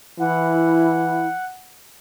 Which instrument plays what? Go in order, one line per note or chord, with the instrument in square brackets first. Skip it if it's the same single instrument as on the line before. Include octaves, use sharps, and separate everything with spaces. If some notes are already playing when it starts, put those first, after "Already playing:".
[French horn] E3 [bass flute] E4 [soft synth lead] F#5